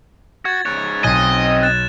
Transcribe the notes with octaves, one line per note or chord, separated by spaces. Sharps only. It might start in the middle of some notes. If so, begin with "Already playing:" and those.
F#4 G#6 A6
G#2 C#5 F#6
B1 C4 D#5 G#5
F#6 A6 E7